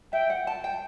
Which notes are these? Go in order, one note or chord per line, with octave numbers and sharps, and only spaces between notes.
E5 G5
F#5
A5
G5